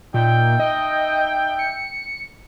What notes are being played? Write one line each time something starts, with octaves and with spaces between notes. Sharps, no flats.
A#2 D#4 E5 G5
D#5
C#7